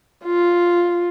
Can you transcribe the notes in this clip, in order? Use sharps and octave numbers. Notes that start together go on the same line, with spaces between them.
F4